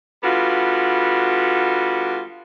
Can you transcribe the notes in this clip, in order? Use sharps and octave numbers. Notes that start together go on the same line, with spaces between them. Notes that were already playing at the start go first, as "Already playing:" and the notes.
D3 G3 B3 F4 F#4